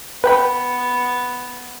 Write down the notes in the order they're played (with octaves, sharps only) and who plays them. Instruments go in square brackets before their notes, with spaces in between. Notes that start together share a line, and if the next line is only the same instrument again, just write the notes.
[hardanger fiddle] B3 [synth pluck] B4 G5 B5